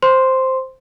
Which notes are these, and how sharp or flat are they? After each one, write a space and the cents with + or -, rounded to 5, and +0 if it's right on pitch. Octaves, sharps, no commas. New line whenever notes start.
C5 +0 C6 +0